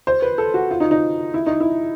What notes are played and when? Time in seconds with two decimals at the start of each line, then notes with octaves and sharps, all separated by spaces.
0.07 C5
0.22 B4
0.38 A4
0.54 F#4
0.71 F4
0.80 D#4
0.91 D#4
1.34 E4
1.46 D#4
1.60 E4